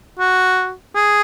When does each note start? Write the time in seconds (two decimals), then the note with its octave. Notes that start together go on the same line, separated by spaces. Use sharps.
0.19 F#4
0.95 G#4